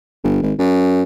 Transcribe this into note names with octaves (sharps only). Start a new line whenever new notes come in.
G1
G#1
F#2